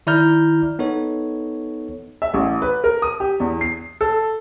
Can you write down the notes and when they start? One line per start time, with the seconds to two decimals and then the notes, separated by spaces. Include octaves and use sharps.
0.07 D#3 E4 D5 A#5 F6 G6
0.79 B3 D#4 A4 C#5
2.22 E5
2.34 A1
2.62 B4
2.84 A#4
3.02 D#6
3.20 G4
3.40 E2
3.61 C7
4.01 A4